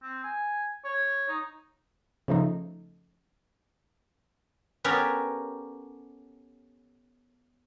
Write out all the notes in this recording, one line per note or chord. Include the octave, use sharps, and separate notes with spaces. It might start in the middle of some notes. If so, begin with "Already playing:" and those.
C4
G#5
C#5
D#4
C#3 F3 A3 D#4
B3 C#4 G4 A4 A#4